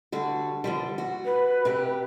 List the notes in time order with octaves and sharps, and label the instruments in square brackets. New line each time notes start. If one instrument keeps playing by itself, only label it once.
[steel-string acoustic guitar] D3 G3 F#4
D3 F3 G3
F#4
[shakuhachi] B4
[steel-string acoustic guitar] C3 G4